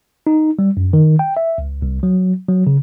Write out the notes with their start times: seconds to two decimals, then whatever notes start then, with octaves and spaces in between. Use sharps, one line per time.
0.27 D#4
0.59 G3
0.77 F#2
0.93 D#3
1.19 G5
1.37 E5
1.58 C#2
1.82 C2
2.03 F#3
2.48 F#3
2.67 C#3